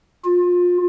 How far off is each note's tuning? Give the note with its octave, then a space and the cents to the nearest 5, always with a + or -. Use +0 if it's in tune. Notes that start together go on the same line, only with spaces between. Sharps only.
F4 +25